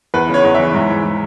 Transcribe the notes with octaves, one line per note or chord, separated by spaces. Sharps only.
E2 B4
C#3 C#5
E2
E3 E5
G#2
E3
E3